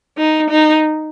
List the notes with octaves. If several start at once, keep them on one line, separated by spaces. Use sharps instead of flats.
D#4
D#4